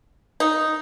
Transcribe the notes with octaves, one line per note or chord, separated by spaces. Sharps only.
D#4